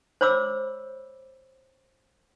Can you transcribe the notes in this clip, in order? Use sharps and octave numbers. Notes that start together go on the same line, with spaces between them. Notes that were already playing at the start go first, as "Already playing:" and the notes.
C5 C#5 B5 D6 E6